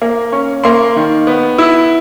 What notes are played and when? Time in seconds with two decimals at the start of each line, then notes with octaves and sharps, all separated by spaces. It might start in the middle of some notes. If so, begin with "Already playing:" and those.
0.02 A#3
0.32 C#4
0.64 A#3 C6
0.96 D#3
1.27 B3
1.58 E4